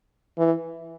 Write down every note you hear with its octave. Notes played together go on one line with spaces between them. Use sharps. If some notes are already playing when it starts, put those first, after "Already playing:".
E3